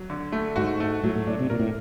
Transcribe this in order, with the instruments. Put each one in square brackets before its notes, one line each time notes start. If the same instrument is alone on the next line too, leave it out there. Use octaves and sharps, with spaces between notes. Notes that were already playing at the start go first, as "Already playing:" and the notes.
Already playing: [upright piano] F#3
D3
A3
[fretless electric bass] G#2 [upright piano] F#4
[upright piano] A3
[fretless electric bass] A2 [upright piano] F#3
[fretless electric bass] A2
[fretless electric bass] A2 [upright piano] D4
[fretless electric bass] C3
[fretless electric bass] A#2 [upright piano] A#4
[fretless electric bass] A2